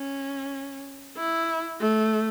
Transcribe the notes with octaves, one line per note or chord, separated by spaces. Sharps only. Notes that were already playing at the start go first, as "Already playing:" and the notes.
Already playing: C#4
E4
A3